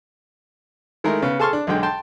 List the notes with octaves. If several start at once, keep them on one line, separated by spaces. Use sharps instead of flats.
D#3 G#3 A3 E4 A#4
C#3 B3
G#4 A4 A5 C6 C#6 F6
D4
B1 D3 G#3 G5
G5 A5 C6